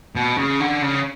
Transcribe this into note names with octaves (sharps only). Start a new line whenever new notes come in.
B2
C#3
D3
C#3